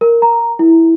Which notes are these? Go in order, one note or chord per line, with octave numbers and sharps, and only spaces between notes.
A#4
A#5
E4